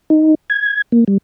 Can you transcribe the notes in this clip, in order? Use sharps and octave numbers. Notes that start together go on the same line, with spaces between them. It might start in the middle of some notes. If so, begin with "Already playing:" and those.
D#4
G#6
A#3
G3